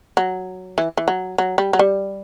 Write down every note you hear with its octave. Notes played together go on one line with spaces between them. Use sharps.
F#3
E3
E3
F#3
F#3
G3
F#3
G3